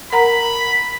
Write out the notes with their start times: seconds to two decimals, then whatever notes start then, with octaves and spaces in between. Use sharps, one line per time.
0.12 A#4 F#5 A#5 B5